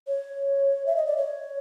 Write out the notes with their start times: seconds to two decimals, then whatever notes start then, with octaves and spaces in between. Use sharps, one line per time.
0.07 C#5
0.86 E5
0.96 D#5
1.06 D5
1.17 C#5